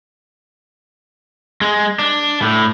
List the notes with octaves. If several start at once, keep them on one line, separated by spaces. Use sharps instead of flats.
G#3
D4
A2